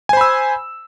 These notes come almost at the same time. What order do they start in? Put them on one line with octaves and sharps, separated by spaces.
G#5 C5 B5 E6